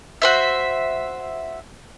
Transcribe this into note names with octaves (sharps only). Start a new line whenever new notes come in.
F#4 C5 E5